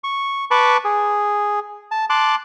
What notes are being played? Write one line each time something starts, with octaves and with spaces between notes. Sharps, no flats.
C#6
B4 A5 B5 C#6 D6
G#4
A5
A5 C6 D6 F#6